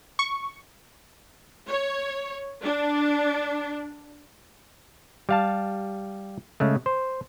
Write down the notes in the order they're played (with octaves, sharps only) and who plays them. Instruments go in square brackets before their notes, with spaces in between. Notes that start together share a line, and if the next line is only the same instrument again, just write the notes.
[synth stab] C#6
[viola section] C#5
D4
[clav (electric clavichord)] G3 F5 A5
C#3 G#3 A3
C5